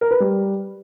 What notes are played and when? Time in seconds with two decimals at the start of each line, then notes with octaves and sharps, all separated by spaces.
0.01 A#4
0.11 B4
0.20 G3